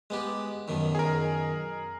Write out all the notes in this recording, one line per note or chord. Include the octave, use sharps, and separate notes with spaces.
G#3 B3 G4
F#2 B2 D#3
G#4 A#4